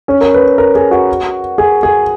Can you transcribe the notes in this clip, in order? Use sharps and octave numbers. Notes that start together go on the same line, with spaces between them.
C#4
A#4
B4
A#4
G#4
F#4
G#4
G#4